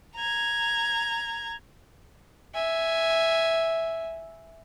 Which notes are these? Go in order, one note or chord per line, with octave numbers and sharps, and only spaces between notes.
A#5 G#6
E5 G#5